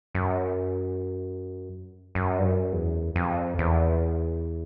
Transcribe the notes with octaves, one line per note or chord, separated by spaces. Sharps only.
F#2
F#2
G2
F#2
E2
F2
E2